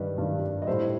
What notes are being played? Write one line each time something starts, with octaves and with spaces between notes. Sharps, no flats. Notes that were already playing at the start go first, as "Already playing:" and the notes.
Already playing: G2 D#3 G3 B4 D#5
G2 D#3 G3
D#5
A2 G3 C5 E5